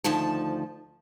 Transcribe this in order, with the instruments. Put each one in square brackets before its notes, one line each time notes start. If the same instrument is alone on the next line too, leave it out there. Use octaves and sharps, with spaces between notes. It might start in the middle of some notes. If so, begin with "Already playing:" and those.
[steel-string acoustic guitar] D2 D#3 F3 A5